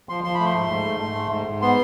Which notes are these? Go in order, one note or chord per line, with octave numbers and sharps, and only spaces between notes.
F3 C6
F3 C6
A3 B5
C6
G#2
G#2
A3
A3
G#2
G#2
G#2
B3 C6